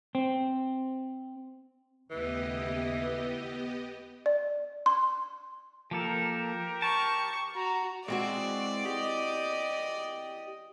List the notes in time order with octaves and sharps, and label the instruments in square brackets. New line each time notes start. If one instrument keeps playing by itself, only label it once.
[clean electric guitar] C4
[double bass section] D#2 C#3 A3 [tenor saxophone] E3 [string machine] B3 G4 D#5
[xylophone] D5
C6
[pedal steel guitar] F3 A#3 A4 [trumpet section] G4 A#4
[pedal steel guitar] A5 [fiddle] C#6
[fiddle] F#4 [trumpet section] A#5
[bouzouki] E3 C4 F#4 [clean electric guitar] G#3 [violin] D5
[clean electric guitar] G4 [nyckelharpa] D#5